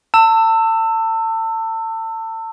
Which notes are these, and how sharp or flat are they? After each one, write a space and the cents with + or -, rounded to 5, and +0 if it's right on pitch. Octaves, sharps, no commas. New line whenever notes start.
A5 +35 E6 +0